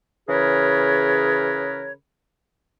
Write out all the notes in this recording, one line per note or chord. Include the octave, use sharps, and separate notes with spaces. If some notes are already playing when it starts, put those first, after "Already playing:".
C#3 E3 G#4 A#4 B4 C#5